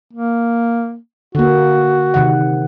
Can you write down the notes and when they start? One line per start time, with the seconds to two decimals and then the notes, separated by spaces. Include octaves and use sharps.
0.13 A#3
1.35 D3 A#3 F#4
2.14 C3 D#3 F#5